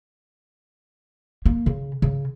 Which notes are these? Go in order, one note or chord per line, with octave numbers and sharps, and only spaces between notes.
A#3
C#3
C#3